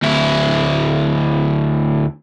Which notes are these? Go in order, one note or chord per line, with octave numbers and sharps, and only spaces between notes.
D2 E4